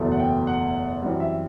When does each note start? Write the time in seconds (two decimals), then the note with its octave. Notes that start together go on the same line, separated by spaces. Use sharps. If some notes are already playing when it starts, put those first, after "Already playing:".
Already playing: F#1 E2 B2 A3
0.12 F#5
0.20 G5
0.47 F#5
1.01 F#2 E3 G3 C4 F#5
1.20 E5